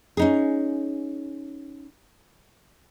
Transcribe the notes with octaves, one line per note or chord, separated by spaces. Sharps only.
C#4 D#4 G#4